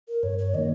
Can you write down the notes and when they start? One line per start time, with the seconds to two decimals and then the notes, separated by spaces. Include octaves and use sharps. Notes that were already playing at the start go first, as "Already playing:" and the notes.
0.08 A#4
0.23 G2 C#5
0.38 C#5
0.54 D#3 A#3 D#5